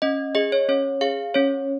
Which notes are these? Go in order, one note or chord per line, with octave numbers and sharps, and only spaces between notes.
C#4 D#5
G#4 D#5
C#5
C#4 C#5
G#4 F5
C#4 C#5